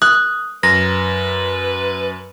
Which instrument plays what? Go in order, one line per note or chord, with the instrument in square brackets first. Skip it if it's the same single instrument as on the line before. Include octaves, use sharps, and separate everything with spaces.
[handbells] D#6 [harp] F#6
[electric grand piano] F#2 [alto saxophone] B4 [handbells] A#6